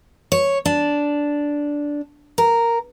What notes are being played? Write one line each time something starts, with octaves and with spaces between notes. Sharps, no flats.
C#5
D4
A#4